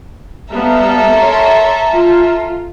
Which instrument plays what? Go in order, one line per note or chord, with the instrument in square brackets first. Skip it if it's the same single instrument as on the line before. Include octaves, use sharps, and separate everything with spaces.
[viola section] G3 B3 F5 [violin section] A4 E5 A#5
[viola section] A#4 C#5 C6
F4